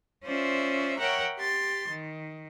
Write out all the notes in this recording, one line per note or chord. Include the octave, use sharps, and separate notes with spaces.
C#4 F4 C5 D5 E5
A#4 C#5 E5 F#5 G5 A#5
G4 C6 A6
D#3